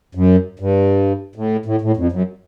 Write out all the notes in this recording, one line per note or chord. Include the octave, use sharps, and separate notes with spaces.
F#2
G2
A2
A2
A2
F2
F#2